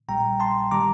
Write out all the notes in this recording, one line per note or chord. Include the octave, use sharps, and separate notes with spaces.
A#1 A#2 G3 G5 A#5
A5 C6
D#3 G3 A#5 D6